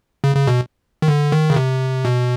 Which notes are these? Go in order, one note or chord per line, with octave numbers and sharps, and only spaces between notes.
C#3
C#3
B2
D#3
D3
D#3
C#3
C3
B2